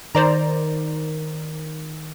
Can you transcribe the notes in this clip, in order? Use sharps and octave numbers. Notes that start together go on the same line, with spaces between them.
D#3 C5 D5 A#5